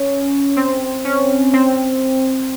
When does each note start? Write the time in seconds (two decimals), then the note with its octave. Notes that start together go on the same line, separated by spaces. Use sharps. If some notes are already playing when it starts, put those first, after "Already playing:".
Already playing: C#4
0.56 C4
1.05 C#4
1.53 C4